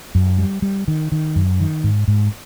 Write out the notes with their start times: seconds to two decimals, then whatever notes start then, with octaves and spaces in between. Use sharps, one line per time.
0.15 F#2
0.38 G3
0.62 G3
0.88 D#3
1.12 D#3
1.36 F#2
1.60 D#3
1.84 G#2
2.08 G#2